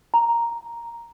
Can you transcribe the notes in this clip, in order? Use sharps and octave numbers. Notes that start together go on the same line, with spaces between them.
A#5